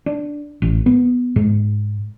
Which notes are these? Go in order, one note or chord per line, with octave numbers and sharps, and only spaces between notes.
D4
A1
B3
G#2